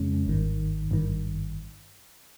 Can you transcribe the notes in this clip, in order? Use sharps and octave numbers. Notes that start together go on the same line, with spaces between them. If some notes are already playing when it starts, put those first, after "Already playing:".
Already playing: F2 C#3 G#3 C#4
G#1 G2 D#3
G#1 G2 D#3